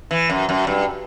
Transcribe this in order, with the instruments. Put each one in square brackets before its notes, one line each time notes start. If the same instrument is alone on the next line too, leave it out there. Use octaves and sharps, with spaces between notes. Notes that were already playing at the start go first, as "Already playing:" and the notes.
[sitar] E3
F#2
F#2
G2